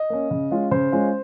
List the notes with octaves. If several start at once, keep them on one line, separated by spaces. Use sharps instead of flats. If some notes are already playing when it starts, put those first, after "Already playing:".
Already playing: D#5
A#3 C#4
C#3
G#3 C#4 F4
C#3 C5
G#3 C#4 F4